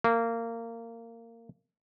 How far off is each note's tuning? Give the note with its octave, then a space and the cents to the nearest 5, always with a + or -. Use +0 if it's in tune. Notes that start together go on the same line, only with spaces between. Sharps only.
A#3 -20